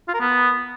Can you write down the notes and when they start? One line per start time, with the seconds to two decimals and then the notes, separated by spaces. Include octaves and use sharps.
0.08 F4
0.14 A#4
0.20 B3